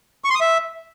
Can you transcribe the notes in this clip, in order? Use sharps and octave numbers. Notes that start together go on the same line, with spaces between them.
C#6
C6
D#6
E5